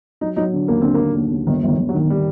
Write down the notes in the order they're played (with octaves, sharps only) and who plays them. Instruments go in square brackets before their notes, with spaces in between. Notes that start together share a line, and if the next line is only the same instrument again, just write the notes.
[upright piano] F#3 [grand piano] D#4
[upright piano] F#3 [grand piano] D#4
[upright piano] D3
[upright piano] D#2 [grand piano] A#3
[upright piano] D3 [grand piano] C4
[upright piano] D#2 [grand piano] A#3
[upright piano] D#2
D#2
[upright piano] G1 [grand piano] D#3
[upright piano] G1 [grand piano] D#3
[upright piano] G1
[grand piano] F#3
[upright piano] D#3
[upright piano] D#3 [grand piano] G3